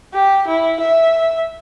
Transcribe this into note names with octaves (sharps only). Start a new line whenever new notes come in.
G4
E4
E5